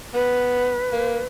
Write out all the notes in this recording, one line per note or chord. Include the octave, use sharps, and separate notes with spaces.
B3 B4
A#3